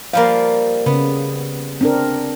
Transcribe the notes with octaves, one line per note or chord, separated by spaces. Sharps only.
F3 G3 A#3 F5
C#3 B3
C4 D4 A#4